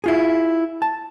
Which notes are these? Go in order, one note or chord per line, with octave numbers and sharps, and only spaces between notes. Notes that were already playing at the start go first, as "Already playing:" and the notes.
E4 F4 G#4
A5